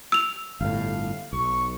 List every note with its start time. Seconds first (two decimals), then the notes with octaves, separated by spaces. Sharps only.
0.12 E6 F7
0.61 G1 A2 F5
1.33 B1 C#6